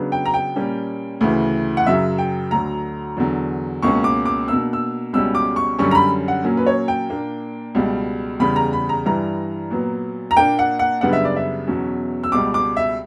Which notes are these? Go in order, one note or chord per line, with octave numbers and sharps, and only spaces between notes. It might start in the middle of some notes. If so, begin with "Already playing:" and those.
Already playing: C#3 F#3 B3 D4
G5
A#5
G5
A#2 G3 A#3 C#4
D2 C#3 E3
F#5
F#2 C#3 F#3 E5
G5
D2 D3 F#3 A#5
E2 D3 F#3
C#2 B2 A#3 C#4 C#6
D6
D6
B2 A#3 D4 E6
E6
C#2 B2 G3 C#4 E6
D6
C#6
F#2 D3 G3 C#4 C#6
A#5
B5
F#5
A#2 F#3 A#3 C#4
B4
C#5
G5
A#2 A#3 D4
C#2 B2 G3
E2 C#3 G3 B5
A#5
B5
A#5
G2 E3 G3 A#5
A#2 F#3 B3
A#5
A#2 A#3 D4 G5
F#5
F#5
F#2 C#3 G3 B3 D4 F#5
E5
D5
E5
E2 B2 F#3 C#4
E6
C#2 B2 G3 D6
D6
E5